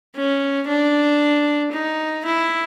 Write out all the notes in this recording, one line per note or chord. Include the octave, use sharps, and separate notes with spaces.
C#4
D4
D#4
E4